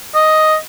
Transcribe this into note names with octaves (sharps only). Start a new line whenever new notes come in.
D#5